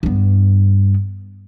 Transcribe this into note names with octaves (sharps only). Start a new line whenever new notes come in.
G2 B3